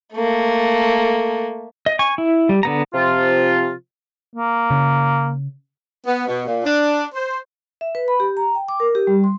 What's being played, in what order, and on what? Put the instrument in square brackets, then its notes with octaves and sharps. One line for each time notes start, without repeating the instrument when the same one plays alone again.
[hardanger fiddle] A3 A#3
[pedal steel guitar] D#5
G#5 C#6
E4
G3
D3 B3 A#5
[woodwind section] C3 F3 F4
[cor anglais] A#3
[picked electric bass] C#3
[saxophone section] B3
B2
A#2
D4
C5
[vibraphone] E5
B4
B5
G4
A#5
G5
D6
A#4
G4
G3
C6